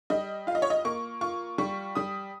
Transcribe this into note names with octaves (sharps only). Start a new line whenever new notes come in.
G3 D#5
F4 F5
D#5
C#5
D#5
A#3 C#6
F4 C#6
G3 C#6
G3 D#6